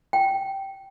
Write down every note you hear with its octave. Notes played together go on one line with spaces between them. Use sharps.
G5